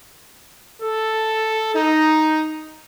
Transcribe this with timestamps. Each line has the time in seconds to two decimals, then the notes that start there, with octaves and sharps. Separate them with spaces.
0.81 A4
1.74 D#4